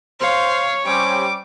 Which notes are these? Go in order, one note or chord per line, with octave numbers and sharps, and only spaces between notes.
C5 C#5 F5
G3 C4 C#4 G4 D6